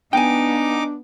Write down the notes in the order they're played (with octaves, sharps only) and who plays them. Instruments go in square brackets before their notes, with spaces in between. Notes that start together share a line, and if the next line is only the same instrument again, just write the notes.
[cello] B3 [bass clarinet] D4 [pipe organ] D#4 D6 [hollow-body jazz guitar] G5 G#5